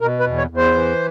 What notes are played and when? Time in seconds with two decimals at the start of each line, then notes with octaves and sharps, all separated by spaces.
0.01 B2 A#4
0.20 B4
0.26 E2
0.38 C#5
0.50 E2
0.57 C5
0.75 E3